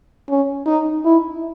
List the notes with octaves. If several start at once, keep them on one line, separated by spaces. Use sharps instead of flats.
C#4
D#4
E4